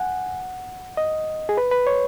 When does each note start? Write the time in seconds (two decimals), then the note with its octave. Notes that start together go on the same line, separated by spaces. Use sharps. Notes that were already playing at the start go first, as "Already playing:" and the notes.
Already playing: F#5 G#5
0.97 D#5
1.49 G#4
1.57 B4
1.72 B4
1.87 C#5